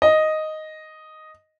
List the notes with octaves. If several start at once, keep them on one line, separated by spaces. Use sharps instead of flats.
D#5